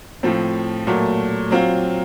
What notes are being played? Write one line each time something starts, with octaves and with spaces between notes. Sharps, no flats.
A2 F3 C4
A#2 F#3 A3
F#3 C4 F4